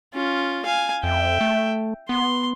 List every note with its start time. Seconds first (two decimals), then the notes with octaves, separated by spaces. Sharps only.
0.14 C#4 F4
0.65 F5 G#5
1.04 F2 E5 G5
1.41 A3
2.09 B3 C6